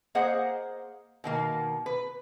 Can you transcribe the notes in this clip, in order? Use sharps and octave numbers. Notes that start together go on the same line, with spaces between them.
A#3 G#4 C5 D#5 F#5
B2 D#3 A#3
B4